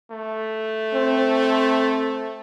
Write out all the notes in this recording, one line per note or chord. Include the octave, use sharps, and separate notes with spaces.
A3
C4